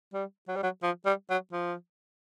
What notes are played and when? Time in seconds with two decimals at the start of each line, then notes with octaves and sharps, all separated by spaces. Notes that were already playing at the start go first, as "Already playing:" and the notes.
0.14 G3
0.48 F#3
0.56 G3
0.63 F#3
0.83 F3
1.06 G3
1.30 F#3
1.53 F3